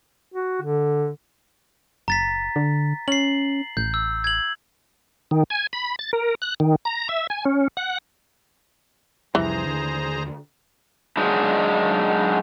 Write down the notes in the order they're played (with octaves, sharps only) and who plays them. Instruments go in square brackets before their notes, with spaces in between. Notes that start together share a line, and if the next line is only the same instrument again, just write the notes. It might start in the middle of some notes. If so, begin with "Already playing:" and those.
[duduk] F#4
D3
[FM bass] F#1 [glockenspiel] A#5 A6 B6
[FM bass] D3
[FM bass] C#4 [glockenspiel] C7 F#7
[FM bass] A1 [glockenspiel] G6
[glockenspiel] E6
G#6 F#7
[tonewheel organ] D#3
G#5
B5
A6
A#4
F#6
D#3
A#5
E5
G#5
C#4
F#5
[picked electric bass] C2 F2 G3 [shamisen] E3 [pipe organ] G#4 C5 A#5
[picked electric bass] D#2 D3
[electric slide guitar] F#3 G#3 D4 D#4